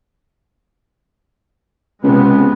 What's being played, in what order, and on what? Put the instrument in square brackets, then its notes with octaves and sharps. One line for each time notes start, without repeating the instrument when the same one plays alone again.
[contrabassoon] C#2 [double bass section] C3 G#3 B3